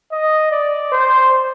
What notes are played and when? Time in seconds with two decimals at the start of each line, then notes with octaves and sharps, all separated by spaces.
0.12 D#5
0.51 D5
0.92 C5